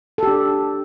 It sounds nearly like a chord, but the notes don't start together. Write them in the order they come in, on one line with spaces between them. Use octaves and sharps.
A4 G4 D4